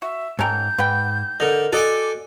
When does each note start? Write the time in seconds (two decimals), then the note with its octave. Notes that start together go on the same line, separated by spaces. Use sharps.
0.02 F#4 E5
0.39 G#2 C#4 A4 A#4 G5 G6
0.78 G#2 B4 F#5 G5
1.40 D3 A#4 D#5
1.73 F#4 A4 D5 D#5 G5 G#5 D6